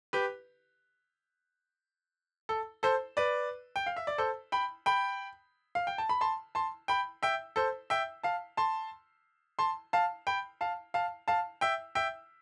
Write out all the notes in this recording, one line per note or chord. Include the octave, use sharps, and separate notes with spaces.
G4 B4
A4
A4 C5
B4 D5
G5
F5
E5
D5
A4 C5
G5 B5
G5 B5
F5
G5
A5
B5
A5 C6
A5 C6
G5 B5
E5 G5
A4 C5
E5 G5
F5 A5
A5 C6
A5 C6
F5 A5
G5 B5
F5 A5
F5 A5
F5 A5
E5 G5
E5 G5